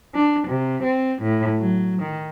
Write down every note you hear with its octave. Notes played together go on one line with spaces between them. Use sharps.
D4
C3
C4
A2
F#3
D#3